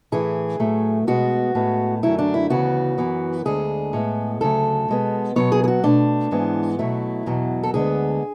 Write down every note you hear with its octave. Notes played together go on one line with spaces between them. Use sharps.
A2 E3 A3 G#4
A2 F#3 A3
B2 G#3 B3 F#4
A2 G#3 B3
F#2 D3 F#3 A3 E4
D4
E4
D2 C#3 E3 B3 F#4
F#2 E3 B3
D2 D3 G#3 G#4
A2 G#3 B3
D2 C#3 F#3 A3 A4
B2 G#3 B3
B2 F#3 B3 C#5
G#4
G#4
F#4
B2 A3 D4
G#2 E3 G#3 B3
B2 F#3 A3 E4
E2 B2 F#3
A4
D2 D3 G#3 B3 G#4